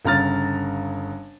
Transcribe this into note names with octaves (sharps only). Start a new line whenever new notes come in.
G1 C#3 A#5 F6 A6